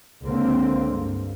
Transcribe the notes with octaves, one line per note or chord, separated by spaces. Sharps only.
C#2 D3 A#3 C4
G2